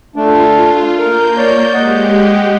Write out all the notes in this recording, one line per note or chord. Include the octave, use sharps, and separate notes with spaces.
A3 D4 F4
A#3 A#4 G6
C#5 D5
G#3 G4 D#5 F#5